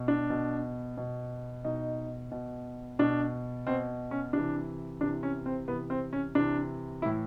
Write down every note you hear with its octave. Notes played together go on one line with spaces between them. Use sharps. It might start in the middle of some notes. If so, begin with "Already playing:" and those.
Already playing: B2
D4
B2
B2
B2 D#4
B2
B2 D4
B2 C4
C#4
C3 E3 D4
C3 E3 D4
C#4
C4
C3 E3 B3
C4
C#4
C3 E3 D4
A2 E3 E4